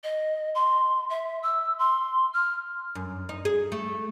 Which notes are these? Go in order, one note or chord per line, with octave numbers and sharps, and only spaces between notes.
D#5
C6
E5
E6
C6
F6
F#2
D#4
G#4
A3